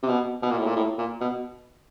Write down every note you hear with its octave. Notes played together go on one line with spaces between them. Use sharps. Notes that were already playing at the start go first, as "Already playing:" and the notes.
C3
B2
B2
A#2
A2
A#2
A2
A#2
B2